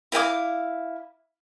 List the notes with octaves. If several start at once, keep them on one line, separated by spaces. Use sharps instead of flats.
E4 F5 G5 D6